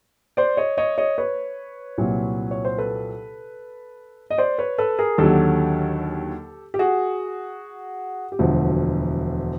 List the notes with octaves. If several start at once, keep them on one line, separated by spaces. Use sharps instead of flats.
C5 D5
C#5 D#5
C#5 D#5
C#5 D#5
B4 C#5
C2 A#2 F#3
C#5
C5
A4 B4
D#5
C5 D5
B4 C#5
A4 B4
G#4 A#4
D#2 D3 F#3 G4 A4
G4
F#4 G#4
G4
E1 D2 D3 F3 F#4